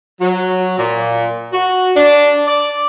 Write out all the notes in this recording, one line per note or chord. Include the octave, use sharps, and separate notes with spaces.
F#3
A#2
F#4
D4
D5